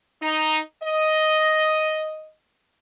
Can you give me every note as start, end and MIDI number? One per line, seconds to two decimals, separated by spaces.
0.21 0.58 63
0.82 2.32 75